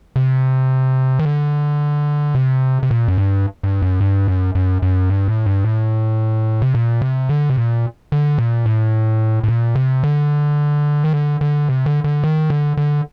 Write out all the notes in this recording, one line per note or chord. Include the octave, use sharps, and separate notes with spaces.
C3
D#3
D3
C3
C3
A#2
F#2
G2
G2
F#2
G2
F#2
F#2
F#2
G2
A2
G2
A2
C3
A#2
C3
D3
C3
A#2
D3
A#2
A2
A2
A#2
C3
D3
D#3
D3
D3
C3
D3
D3
D#3
D3
D3